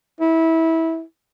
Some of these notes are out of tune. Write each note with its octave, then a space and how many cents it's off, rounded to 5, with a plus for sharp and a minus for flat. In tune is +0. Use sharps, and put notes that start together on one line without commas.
E4 -20